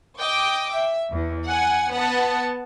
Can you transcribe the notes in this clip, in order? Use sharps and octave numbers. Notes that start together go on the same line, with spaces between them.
D#5 G5 D6
E5
E2
F#5 G#5
B3 F#5 A5